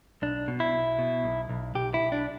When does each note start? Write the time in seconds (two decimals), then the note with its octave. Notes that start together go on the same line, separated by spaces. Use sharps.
0.22 B1 D4
0.48 B2
0.60 E4
0.73 B1
0.99 B2
1.24 B1
1.49 B1
1.75 B1 G4
1.94 E4
2.00 B1
2.12 D4